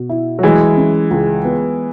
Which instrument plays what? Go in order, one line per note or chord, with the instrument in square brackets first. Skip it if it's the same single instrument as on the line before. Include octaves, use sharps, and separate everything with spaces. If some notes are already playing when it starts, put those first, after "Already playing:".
Already playing: [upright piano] B2
E4
[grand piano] F#3
[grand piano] E3 G#3 [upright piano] F#4
[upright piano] C#4
C#2
B3